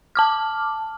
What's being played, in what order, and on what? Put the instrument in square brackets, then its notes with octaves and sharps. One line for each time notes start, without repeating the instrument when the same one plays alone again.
[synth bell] A5 D6 F6